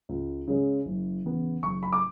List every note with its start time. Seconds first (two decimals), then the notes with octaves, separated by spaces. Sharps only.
0.09 C#2
0.48 C#3 G#3 C#4
0.86 F#1
1.25 E2 C#3 E3 B3
1.63 F#1 C#6
1.83 B5
1.93 D6